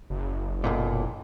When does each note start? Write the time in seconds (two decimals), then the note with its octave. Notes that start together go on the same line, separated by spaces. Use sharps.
0.10 F#1
0.64 B1 F#2 A#2